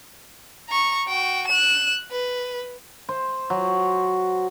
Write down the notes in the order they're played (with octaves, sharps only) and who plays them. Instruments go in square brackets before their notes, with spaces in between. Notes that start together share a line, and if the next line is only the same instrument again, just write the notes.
[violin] A#5 C#6
F#4 G5
F#6 E7
B4
[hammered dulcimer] C5
F#3